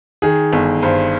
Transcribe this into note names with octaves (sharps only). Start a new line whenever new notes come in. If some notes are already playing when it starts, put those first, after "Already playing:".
D#3 G#4
G1
G2 C5